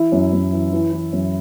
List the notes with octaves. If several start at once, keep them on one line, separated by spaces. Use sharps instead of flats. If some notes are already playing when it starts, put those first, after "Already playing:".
Already playing: E3 E4
F#2
F#2
E3
E3
E3
F#2